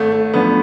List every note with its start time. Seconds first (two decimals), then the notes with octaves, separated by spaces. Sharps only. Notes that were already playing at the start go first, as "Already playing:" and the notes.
Already playing: G#1 A3
0.12 A3
0.34 F#2 D3 F3 B3